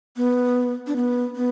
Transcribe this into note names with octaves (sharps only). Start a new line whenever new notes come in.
B3
D4
B3
B3